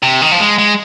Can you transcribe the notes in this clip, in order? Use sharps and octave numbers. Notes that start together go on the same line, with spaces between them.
C3
D#3
F3
G#3
G#3